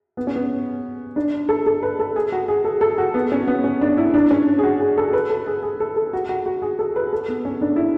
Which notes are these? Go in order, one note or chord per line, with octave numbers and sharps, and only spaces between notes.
B3
C#4
B3
D4
A4
A4
B4
A4
G#4
F#4
G#4
A4
A4
F#4
B3
C#4
B3
C#4
D4
E4
D4
C#4
G#4
F#4
G#4
A4
B4
A4
G#4
G#4
A4
A4
F#4
F#4
F#4
G#4
A4
B4
A4
B3
C#4
D4
E4